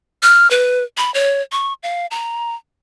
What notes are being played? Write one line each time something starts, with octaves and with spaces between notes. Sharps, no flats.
F6
B4
B5
C#5
C#6
F5
A#5